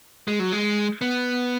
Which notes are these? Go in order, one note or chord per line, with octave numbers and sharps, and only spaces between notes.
G#3
F#3
G#3
B3